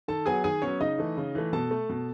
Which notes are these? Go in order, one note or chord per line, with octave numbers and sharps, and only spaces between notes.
D#3 A4 A5
F#3 B3 G#4 G#5
D#3 G#4 G#5
F#3 B3 C#4 C#5
C#3 D#4 D#5
E3 A3
C#3
E3 A3
B2 A4 A5
A3
B2